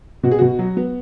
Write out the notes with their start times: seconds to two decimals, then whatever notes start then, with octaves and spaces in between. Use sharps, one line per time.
0.23 B2 F#4
0.31 G#4
0.39 B2 F#4
0.59 F#3
0.77 B3